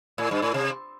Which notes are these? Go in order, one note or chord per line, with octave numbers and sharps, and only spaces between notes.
A2
G2
A2
C3